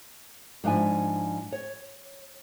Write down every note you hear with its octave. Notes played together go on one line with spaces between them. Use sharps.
G#2 F3 D4 E4 G#5
C#5